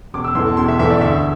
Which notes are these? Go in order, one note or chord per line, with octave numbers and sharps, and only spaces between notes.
E1 D6
E6
E2 E3 A3 C6
A5
E1 C6
E5
E2 E3 A3 E5
D5
D2 E5